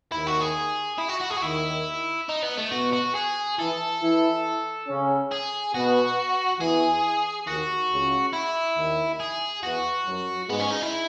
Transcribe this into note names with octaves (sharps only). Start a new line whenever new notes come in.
D#2 D#3 E4
F#4
G#4
E4
F#4
F#4
G#4
F#4
D#2 D#3 E4
D#4
B3
A3
B2 B3 F#4
F#4
G#4
E3 E4 A4
E3 E4
C#3 C#4
G#4
B2 B3 F#4
E2 E3 G#4
D#2 D#3 F#4
C#2 C#3
E4
D#2 D#3
G#4
E2 E3 F#4
F#2 F#3
G#2 G#3 B3
C#4
D#4
E4